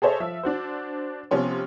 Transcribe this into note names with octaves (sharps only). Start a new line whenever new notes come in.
G#4 A4 C5 C#5 D#5 E5
F3 E5 E6
D4 F#4 C5
C3 F3 B3 C#4 C6